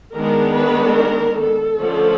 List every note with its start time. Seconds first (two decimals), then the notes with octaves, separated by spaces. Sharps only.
0.15 D#3 G#3 B3 D4 A#4
0.56 B4
0.97 A#4
1.39 A4
1.79 D3 F3 A3 C#4